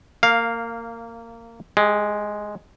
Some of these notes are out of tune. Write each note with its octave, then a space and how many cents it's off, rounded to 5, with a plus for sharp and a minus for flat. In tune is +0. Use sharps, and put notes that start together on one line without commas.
A#3 -20 F5 +0
G#3 +5 G4 +40